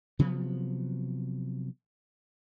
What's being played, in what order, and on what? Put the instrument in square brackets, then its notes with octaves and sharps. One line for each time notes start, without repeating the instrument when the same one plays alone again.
[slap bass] C3 F3 F#3 B3